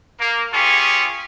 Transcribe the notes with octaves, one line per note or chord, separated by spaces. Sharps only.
A#3
C#4 F4 G4 G#4 C#6